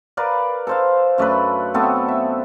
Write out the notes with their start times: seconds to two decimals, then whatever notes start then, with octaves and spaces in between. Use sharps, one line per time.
0.17 A#4 B4 D5 F5
0.67 A4 C5 F5
1.18 F#2 A3 D4 B4
1.74 A3 B3 C4 A4
2.08 E5